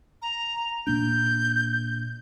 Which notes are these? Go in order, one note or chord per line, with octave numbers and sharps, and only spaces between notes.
A#5
A#2 A#3 D4 G6